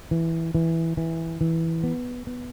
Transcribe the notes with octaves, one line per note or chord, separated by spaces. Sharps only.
E3
E3
E3
E3
B3
B3